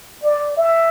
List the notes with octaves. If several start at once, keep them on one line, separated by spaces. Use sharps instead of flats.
D5
E5